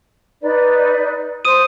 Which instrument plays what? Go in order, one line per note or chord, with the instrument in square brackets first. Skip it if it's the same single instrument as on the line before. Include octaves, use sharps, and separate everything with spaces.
[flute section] D#4 B4 D5
[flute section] C5 [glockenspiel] D#6 D#7